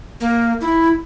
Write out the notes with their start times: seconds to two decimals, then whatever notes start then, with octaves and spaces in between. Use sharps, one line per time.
0.21 A#3
0.61 E4